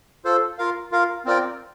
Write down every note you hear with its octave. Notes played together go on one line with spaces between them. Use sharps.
F4 A4 C5
F4 A#4 F5
F4 A#4 F5
C4 F4 A#4 D5 G5